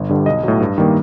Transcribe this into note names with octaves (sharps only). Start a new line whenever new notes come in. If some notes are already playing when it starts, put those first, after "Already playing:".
Already playing: G1
G2 D3 G3
B1 D#5
A2 F#3
G2
D#3 G3 A#3